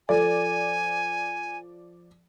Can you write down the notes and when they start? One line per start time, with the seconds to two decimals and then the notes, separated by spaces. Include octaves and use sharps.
0.09 F3 A4 D5 G#5